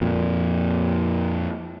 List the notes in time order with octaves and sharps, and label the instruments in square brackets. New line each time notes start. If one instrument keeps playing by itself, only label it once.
[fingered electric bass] F2 A#2